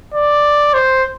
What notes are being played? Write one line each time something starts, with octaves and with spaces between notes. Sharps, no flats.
D5
C5